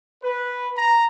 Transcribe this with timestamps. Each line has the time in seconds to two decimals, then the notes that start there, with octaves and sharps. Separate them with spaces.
0.23 B4
0.77 A#5